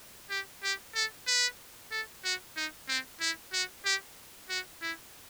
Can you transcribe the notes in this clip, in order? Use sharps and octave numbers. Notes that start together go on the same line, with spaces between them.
G4
G4
A4
B4
A4
F#4
D#4
C4
E4
F#4
G4
F#4
E4